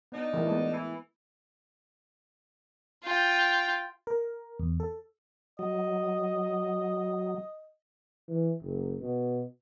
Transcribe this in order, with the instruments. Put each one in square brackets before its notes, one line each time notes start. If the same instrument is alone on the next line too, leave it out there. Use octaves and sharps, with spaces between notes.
[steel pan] B3 [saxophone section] D4 D#4
[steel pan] E3 A3 A#4
G#3 A3 B3
[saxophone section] E3
[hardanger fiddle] F4 G5
[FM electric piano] A#4
E2
A4
[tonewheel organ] F#3 [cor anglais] D#5
[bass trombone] E3
F#1
B2